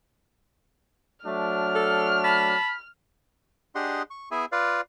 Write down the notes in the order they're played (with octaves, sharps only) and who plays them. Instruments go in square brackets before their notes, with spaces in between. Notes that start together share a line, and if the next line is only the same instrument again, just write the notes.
[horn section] F#3 A3 D4 [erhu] F6
[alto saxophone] A4
[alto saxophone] A5 [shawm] B5
[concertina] D4 G4 G#4 D#5 F#5 C6
C#6
B3 E4 G#4 E5 G#5
F4 B4 D5 F5